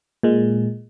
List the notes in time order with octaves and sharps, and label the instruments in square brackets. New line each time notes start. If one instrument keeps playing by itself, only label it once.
[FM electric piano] A#2 G#3